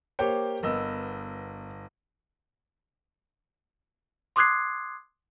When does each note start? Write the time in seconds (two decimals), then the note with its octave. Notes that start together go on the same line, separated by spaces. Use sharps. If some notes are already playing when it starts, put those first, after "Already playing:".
0.19 A#3 G4 C5 C#5 G5
0.63 G1 B3 A#4 D#5 E6
4.36 C6 D6 D#6 F#6 G#6 C7